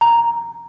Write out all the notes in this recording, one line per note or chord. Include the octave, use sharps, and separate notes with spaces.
A#5